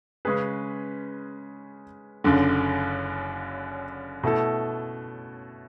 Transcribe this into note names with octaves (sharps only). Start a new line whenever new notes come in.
C#3 G#3 C#4 G#4 B4
F#1 F#2 D3
B2 A3 E4 A4